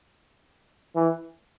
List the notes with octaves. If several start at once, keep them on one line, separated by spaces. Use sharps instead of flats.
E3